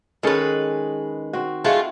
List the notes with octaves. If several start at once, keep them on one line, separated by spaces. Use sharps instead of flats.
D#3 G#3 C#4 A4 B4
C4 F#4
G#3 A3 E4 F4 F#5